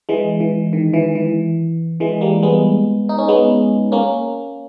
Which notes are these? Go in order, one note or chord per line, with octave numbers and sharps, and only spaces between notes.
E3 G#3
E3
D#3
E3
E3
E3 G#3
G3 A#3
G#3 B3
D#4
C#4
G#3 B3
A#3 C#4